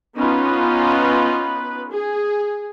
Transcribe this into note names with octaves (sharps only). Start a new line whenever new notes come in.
B3 C#4 D#4 F4 B4
G#4